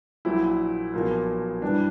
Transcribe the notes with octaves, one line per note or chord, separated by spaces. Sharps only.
A#1 A#2 F#3 E4
B1 A#2 F3 A#3
G2 E3 G3 D4